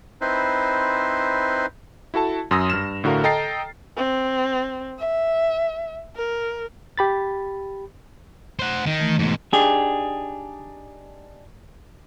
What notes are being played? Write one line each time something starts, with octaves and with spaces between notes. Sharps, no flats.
C4 D#4 E4 B4 C5
E4 F#4 A4 A5
F#2 C6 D#6 E6 A#6
G2 F6 E7
A2 D3 F#4 A#4 F5
A4 D#5 G5 A#5 A6 C7
C4
E5
A#4
G4 B5 A6
C5 F#5
D#3
E3 A3
G#2 B2
D4 D#4 G4 G#4